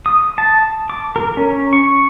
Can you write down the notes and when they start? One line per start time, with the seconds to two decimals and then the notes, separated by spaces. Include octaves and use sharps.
0.06 D#6
0.38 A5
0.90 D6
1.16 A#4
1.37 C#4
1.73 C#6